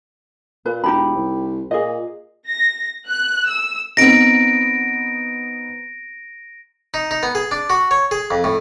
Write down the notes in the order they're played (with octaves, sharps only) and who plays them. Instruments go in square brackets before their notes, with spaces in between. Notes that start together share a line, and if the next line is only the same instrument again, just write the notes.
[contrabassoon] A#2 [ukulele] B4
[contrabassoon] E1 [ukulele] D#4 G4 B5
[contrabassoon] C2
[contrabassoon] A#2 [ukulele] G#4 D#5
[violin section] A#6
F#6
E6
[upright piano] B3 C4 D#4 [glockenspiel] A#6 D7
[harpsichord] D#4
D#4
B3
G#4
D4
F#4
C#5
G#4
F2
A2